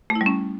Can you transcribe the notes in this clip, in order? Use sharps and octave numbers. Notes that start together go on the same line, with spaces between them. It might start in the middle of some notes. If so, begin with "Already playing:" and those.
A3
E4
G3
C#4